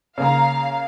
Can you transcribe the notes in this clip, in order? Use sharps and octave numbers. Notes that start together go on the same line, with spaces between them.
C#3 A#3 F5 A#5